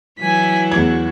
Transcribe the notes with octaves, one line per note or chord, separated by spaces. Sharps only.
E3 F#3 E4 G#5 B6
E2 F#4 G#6